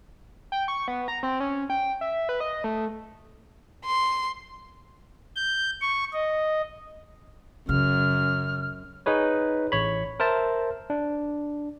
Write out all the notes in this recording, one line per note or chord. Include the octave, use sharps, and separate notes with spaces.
G5
C#6
B3
A#5
C4
C#4
G5
E5
B4
D#5
A3
C6
G6
C#6
D#5
F#2 C#3 F6
D#4 G#4 B4 C#5
A1 C#5 B5
A#4 C5 E5 A5
D4